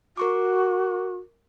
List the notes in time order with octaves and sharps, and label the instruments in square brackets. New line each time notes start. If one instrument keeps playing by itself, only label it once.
[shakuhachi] F#4 [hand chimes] A#4 C#6 D6